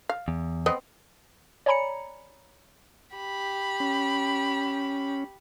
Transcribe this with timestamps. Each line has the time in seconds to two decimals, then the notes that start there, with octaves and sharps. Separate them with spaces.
0.09 F5
0.28 E2
0.66 B3 C4 D#5
1.66 C#5 D5 G#5 A#5 B5 C#7
3.16 G4 B5
3.80 C#4